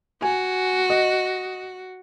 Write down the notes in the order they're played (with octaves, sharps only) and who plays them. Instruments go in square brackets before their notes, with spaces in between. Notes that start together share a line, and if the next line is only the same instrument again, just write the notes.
[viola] F#4 [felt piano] G#5
[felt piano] D#5